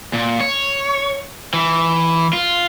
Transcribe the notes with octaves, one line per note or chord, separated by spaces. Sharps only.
A#2
C#5
E3
F4